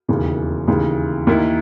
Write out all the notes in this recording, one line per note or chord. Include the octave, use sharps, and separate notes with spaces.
E1 D#2 C#3 E3
D#2 C#3 E3
D#2 D#3 A#3 E4